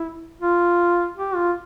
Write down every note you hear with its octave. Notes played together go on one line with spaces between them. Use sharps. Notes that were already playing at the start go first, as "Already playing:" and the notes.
Already playing: E4
F4
G4
F4